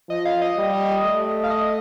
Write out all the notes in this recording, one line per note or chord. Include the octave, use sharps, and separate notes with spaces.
F3 D#5
F5
D#5
G3
A3
F5
D#5